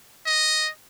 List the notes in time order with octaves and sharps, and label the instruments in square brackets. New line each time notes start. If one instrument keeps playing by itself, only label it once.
[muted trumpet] D#5